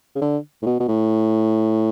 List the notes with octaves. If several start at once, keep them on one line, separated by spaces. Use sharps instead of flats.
C#3
D3
A2
B2
B2
A2